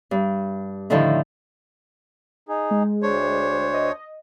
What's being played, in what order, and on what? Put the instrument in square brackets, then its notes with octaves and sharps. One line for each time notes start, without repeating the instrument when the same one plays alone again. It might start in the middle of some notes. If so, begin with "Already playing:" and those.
[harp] G2
A2 D3 D#3 F3 E4 A4
[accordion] D#4 G#4
[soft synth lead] G#3
[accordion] D2 D4 C5 [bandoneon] C#5
[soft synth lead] D#5